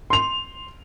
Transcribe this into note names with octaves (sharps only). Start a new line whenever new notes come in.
C6 F7